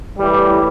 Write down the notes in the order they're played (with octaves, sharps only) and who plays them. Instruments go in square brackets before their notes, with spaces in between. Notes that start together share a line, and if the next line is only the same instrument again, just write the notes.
[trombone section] A2 E3 G3